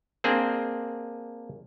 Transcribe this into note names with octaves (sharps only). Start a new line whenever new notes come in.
A#3 C4 D4 G#4